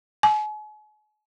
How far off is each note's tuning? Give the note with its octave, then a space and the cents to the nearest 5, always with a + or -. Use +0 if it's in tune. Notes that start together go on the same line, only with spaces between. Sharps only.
G#5 +40